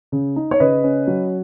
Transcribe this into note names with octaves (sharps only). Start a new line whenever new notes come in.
C#3
D#4
C#5
C#3 B4 D#5
C#4
F#3